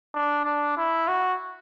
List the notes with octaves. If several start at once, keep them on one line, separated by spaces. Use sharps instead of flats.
D4
D4
E4
F#4